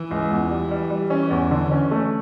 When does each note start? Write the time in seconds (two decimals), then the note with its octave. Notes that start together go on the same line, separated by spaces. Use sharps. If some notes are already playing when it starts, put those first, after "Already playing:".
Already playing: E3
0.11 C#2
0.31 E2
0.51 G3
0.71 G3
0.91 G3
1.10 E3 C#4
1.30 E2
1.51 D3
1.71 C#4
1.91 A3